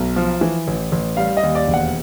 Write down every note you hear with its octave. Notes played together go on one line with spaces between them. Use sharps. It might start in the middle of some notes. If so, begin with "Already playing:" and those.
Already playing: B1
F3
E3
A1
A1
G3 F5
D#5
D#2
D5
E1
F#5